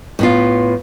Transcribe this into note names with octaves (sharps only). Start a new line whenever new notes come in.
A2 B3 F4